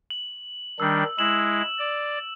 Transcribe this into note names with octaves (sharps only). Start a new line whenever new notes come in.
F#7
D#3 G3 D4 E6
G#3 E4 E7 F#7
D5